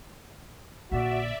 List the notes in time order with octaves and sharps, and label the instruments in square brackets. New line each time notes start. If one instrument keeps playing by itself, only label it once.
[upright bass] A#1 D3 [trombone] F#4 [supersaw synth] D5 E5